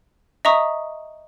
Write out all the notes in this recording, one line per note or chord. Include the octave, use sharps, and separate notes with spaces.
D#5 E5 A#5 C#6 D#6